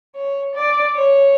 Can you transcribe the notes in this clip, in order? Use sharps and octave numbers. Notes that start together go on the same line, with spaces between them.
C#5
D5
C#5